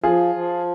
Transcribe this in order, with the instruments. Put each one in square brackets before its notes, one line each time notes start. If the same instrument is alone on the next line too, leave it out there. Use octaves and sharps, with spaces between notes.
[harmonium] F3 [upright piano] F4 G#4
[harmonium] F3